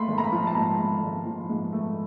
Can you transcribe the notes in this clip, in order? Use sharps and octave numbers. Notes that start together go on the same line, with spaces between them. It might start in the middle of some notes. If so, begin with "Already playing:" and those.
Already playing: A3 B5 C6
G#1
A#5
B5
F3
A5
G#2 A#5
A3
G#1
F3
G#2
A3